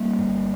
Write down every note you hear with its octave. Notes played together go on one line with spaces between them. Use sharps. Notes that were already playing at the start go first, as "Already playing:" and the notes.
Already playing: G3 A#3
G1 G2